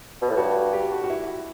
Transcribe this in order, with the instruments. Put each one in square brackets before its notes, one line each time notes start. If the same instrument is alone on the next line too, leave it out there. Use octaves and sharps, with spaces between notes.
[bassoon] B2
A2
[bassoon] G2 [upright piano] F#4
[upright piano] G4
F#4
F#4
E4